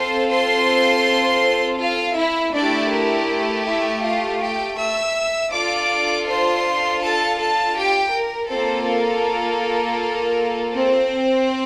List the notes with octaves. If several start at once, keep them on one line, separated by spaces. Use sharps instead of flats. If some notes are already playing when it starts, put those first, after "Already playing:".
Already playing: C4 F4 A4 C5 C6
C5 C6
F4 F5
E4 E5
A3 D4 E4 G4 D5
A#4
E4 E5
F4 F5
G4 G5
E5 E6
D4 F4 A4 D5 D6
C5 C6
A4 A5
A4 A5
G4 G5
A#4
A#3 C4 F4 A4 C5
A#4
C4 C5